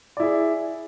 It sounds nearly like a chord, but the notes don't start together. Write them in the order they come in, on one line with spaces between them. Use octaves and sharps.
D5 E4 G#4